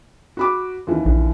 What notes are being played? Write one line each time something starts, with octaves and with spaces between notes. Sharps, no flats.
F#4 B5 D6
D#2 E3
A#1